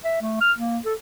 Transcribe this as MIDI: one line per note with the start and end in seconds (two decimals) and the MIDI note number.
0.04 0.20 76
0.22 0.40 57
0.41 0.53 89
0.58 0.79 58
0.85 0.94 69